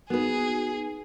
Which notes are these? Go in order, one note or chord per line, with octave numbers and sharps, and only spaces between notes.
B3 D#4 F#4 G#4 B4